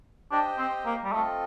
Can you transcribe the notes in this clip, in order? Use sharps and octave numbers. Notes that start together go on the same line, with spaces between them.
D4 G4 C5 D#5 G5
C4
A#3
G3
A3 C4 F4 A4 D#5